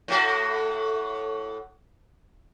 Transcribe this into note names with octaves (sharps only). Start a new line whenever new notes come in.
A2 A3 F#4